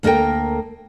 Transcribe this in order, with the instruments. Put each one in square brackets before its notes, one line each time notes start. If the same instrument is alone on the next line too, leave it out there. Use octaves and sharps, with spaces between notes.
[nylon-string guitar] D2 A#3 A4 A#4 G5